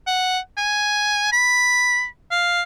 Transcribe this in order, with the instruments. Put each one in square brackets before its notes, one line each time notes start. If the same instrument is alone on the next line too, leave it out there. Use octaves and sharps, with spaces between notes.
[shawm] F#5
G#5
B5
F5